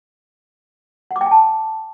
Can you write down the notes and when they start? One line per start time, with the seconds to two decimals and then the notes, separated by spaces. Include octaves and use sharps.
1.11 F#5
1.16 D6
1.21 G5
1.26 G#5
1.31 A5